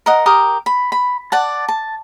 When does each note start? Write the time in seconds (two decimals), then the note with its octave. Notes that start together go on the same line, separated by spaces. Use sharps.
0.06 A#4 D#5 F#5
0.26 G4 A#4 D#6
0.66 B5
0.92 B5
1.32 D5 F#5 A5
1.68 A5